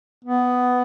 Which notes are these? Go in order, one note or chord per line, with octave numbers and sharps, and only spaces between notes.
B3